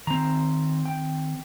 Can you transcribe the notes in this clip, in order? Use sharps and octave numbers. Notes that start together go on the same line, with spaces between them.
D#3 C4 A#5
G5